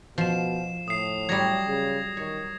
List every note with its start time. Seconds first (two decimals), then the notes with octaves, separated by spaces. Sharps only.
0.18 B2 F3 C7 E7
0.88 A2 D#6 C7
1.29 F#3 G3 G#6 A#6
1.67 C#3
2.17 D#3 C#5